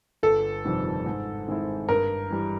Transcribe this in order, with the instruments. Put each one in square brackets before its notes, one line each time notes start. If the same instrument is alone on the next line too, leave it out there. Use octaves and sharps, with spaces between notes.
[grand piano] G1 [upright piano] A4
[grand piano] F2 C3 D#3 G3
G#2
D#3 G#3 C4 E4
[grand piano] G2 [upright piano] A#4
[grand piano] E3 G3